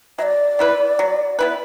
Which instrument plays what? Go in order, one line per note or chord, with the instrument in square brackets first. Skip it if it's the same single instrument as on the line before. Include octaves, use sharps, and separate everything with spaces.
[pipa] F#3 [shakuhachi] D5 E5
[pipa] B3 E4 B4
F#3
B3 E4 B4